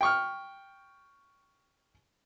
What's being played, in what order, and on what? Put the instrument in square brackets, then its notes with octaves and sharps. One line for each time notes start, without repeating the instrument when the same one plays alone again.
[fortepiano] G5 C#6 F6